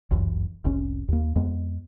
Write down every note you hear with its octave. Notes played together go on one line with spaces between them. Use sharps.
G1 C#2 F#2 E3
F1 C2 C#4
D#2 A#3
F2 G#3 B3